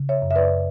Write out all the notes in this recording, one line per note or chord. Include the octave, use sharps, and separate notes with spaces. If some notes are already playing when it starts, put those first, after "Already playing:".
Already playing: C#3
C#5 E5
F#2
E5
B4 D5